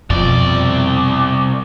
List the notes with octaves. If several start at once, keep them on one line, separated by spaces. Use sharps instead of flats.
C2 F2 B2 D5